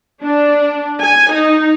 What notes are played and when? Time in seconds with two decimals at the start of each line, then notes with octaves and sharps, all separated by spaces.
0.23 D4
1.01 G#5
1.33 D#4